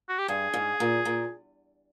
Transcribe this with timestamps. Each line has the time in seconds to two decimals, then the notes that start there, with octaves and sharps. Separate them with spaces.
0.09 F#4
0.18 G4
0.28 G2 G#4
0.54 G#2
0.80 A#2
1.05 A#2